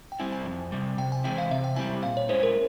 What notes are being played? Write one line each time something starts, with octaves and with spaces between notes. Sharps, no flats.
G5
G3 C4 E4 G#5
G#5
F2
C3 G3
C3 G5
G#5
E3 G#3 C4 E4 G5
F5
C3 E5
G5
G3 C4 E4 G#5
A#2 F5
C#5
G#3 C#4 E4 C5
A#4